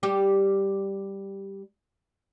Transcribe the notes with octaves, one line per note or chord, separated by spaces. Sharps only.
G3 G4